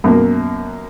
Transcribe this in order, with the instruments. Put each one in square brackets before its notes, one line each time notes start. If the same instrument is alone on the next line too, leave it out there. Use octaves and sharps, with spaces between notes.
[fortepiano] F#2 B2 A#3